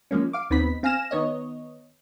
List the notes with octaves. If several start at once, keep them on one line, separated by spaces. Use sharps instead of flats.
F3 G#3 A#3 C#4
F5 D6
D#2 B3 C4 D#4 B5 B6
C4 F5 G#5 F6 A#6 E7
D#3 B3 C#5 D#5